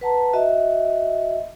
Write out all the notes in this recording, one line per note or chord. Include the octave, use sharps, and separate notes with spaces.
B4 F#5 A5 A#5
F#4 D#5 E5